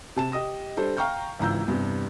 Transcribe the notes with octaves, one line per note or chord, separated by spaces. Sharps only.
C3 A5 E7
G4 D#5 D#6 A#6
G3 D4 A4 C5
F5 G5 A#5 C#6 F6 G6
G#1 C#2 E3 A#5 E6 G6
E2 G2 C3